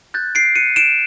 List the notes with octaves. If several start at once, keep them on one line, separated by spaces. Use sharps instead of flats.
F#6 G6 A6
C7 D7
F#6 C#7 D#7
D7 E7